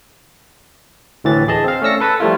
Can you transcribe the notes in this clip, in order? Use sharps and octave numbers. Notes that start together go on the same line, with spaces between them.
D2 A2 E3 A6
G#4 D#5 A5
C4 F5
A3 C#4 D5 E6 A#6 C#7
A4 B4 A5
F3 G3 A3 E4 F4